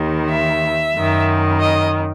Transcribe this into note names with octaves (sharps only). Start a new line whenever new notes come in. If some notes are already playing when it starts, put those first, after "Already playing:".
Already playing: D#2 D#3
E5
F#2 D#3
D#5